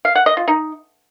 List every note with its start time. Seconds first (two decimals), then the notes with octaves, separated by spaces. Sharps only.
0.05 F5
0.15 F#5
0.26 D#5
0.37 F4
0.48 D#4